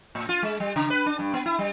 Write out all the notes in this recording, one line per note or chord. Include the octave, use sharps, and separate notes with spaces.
A2
F4
G#3
G3
C#3
B4
D4
G2
B3
E4
G3